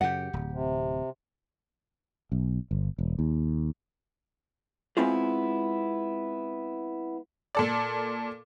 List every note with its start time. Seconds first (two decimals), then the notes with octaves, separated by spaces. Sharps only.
0.01 F#2 C#3 G4 F#5
0.33 D1
0.52 C3
2.32 B1
2.71 G1
2.98 E1
3.19 D#2
4.97 G#3 B3 C4 E4 F4 G#4
7.55 A#2 A4 D5